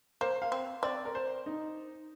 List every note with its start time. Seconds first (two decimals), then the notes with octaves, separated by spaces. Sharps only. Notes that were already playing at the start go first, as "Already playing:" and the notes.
0.21 A#3 C5
0.42 F5
0.52 C4
0.83 C4 D5
1.05 A#4
1.15 C5
1.46 D#4